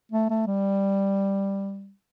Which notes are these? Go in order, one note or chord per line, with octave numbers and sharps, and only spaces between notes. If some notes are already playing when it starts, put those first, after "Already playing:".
A3
A3
G3